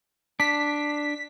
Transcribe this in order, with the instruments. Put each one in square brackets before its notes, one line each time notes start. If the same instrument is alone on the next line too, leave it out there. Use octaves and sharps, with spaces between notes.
[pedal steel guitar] D4 [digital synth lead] B6